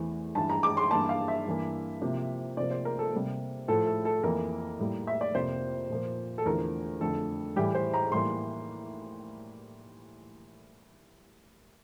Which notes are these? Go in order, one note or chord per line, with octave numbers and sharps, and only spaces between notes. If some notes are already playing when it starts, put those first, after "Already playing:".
Already playing: E2 E3 A3 C4
G2 E3 G3 A5
A#5
D6
C6
G2 E3 A#3 A5
F5
E5
G2 E3 A#3
C3 F3 A#3
C3 F3 A#3 D5
C5
A#4
A4
C3 G3 A#3
A2 F3 A3 A4
A4
A4
F2 E3 A#3 A#4
A2 G3 A#3
E5
D5
F2 C3 F3 A#3 C5
A#2 F3 A#3
A4
E2 D3 F3 A3 A#4
F2 D3 A3 A4
A2 E3 G3 G4
C5
A#5
A2 E3 G3 A#3 C6